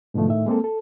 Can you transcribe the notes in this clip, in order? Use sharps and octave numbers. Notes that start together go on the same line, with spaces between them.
G#2 B2 D3 F3 A3
A2 D#3 E5
G#3 A#3 C4 A4
A4